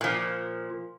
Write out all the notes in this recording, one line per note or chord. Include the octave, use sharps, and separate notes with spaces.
A#2 F3